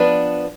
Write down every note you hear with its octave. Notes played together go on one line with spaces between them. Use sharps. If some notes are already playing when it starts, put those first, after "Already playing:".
Already playing: F3 B3 D4 B4